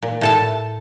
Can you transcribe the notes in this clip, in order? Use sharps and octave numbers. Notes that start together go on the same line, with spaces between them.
A#2
A2 A4 A5